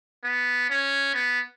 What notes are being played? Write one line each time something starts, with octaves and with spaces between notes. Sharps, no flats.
B3
C#4
B3